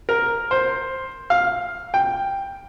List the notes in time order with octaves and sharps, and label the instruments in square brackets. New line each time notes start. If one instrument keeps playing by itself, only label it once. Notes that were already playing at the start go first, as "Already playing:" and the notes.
[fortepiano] A#4
C5
F5
G5